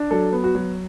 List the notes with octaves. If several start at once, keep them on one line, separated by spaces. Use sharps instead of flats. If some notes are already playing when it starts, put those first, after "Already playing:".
Already playing: D4
F#3 A4
B3
F#4
F#3